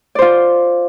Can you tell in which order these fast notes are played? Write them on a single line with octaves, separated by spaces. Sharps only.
D5 C5 F4